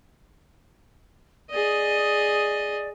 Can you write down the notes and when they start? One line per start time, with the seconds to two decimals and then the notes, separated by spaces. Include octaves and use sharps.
1.51 G#4 D5 D#5